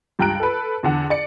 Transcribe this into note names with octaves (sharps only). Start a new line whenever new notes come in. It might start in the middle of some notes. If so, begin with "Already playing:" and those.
C#2 G2 G5 A#5 F#6 D7
A4 B4
E2 D3 F#5
D5 C#7